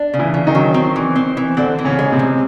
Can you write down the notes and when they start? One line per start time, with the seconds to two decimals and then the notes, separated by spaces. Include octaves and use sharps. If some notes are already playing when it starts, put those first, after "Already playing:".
Already playing: D4
0.14 C#3
0.19 E3 E4
0.34 C#3
0.47 D#3 D#4
0.55 F#3
0.74 C4
0.96 E3
1.16 C4
1.37 E3
1.57 D3 C4 D4
1.79 E3
1.84 C#3 C#4
1.99 G#3
2.12 C3 C4
2.19 G#3